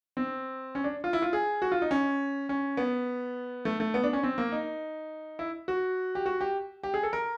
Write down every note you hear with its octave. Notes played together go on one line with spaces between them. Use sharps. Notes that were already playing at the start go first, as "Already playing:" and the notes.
C4
C#4
D4
F4
E4
F4
G#4
F#4
F4
D#4
C#4
C#4
B3
A3
A3
B3
D4
C#4
C4
A#3
D#4
E4
F#4
G4
F#4
G4
G4
G#4
A4
A#4